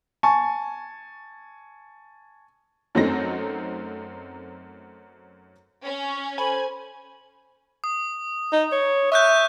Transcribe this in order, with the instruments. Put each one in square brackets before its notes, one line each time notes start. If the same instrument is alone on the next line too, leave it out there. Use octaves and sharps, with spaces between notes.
[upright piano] G#5 A5 C#6
[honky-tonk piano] F#2 F#3 A3 C4 D#4 A#6
[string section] C#4
[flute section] A4 C5 [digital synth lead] G#5 [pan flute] B5
[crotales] D#6
[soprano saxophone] D#4
C#5
[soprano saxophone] E5 [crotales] C#6 F#6 G6